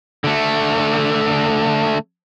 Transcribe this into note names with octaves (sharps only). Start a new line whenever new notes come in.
D3 A3